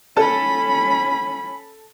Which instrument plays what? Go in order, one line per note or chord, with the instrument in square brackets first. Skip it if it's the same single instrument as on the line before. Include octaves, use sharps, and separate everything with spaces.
[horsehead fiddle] C#4 B5 [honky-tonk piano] A4 A5